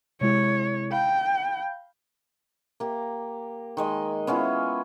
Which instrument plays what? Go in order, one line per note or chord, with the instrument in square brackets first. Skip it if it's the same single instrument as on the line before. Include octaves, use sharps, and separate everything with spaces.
[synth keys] C3 G#3 E4 [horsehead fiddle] C#5
[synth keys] F5 B5 G6 [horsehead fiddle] G5
[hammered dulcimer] A#3 G4
D#3 G#3 D#5
B3 C#4 E4 F4